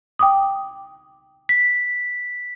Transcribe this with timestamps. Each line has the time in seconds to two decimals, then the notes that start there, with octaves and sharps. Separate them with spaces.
0.19 G5 D6 D#6
1.49 B6